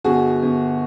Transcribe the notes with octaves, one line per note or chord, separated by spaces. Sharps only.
G1 F#4 G#4
G1